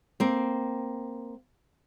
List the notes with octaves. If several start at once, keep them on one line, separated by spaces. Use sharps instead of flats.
A#3 C4